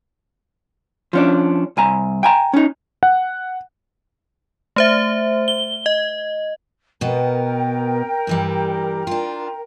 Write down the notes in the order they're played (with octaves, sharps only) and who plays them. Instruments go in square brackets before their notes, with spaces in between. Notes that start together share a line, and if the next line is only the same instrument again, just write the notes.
[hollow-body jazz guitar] F3 C#4 D4
C2 G#5 A#5
G5 G#5 A#5
C#4 D#4
[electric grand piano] F#5
[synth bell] A3 C5 E5
G7
D#5
[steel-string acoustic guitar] B2 B3 [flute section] A#4 G5 A#5
[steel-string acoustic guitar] G2 E3 G3
D4 F4